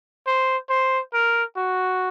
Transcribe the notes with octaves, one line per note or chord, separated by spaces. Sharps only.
C5
C5
A#4
F#4